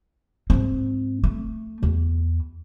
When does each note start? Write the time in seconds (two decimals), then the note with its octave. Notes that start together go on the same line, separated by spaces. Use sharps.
0.50 G#2 C4
1.24 A3
1.83 E2